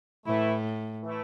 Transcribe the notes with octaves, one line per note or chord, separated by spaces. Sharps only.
A2 E3 A3 E4
E3 A3 E4